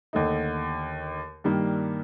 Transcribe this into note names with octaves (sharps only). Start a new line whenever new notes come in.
D#2 D3 A3 D#4
G2 D#3 G3 A#3